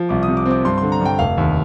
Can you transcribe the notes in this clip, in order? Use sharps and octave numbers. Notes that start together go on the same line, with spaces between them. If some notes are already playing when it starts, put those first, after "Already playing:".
Already playing: F3
C2 D6
D#6
C3
D6
C4
D6
G2 C6
C6
D3
A#5
G2 G5
F1 F5
D#2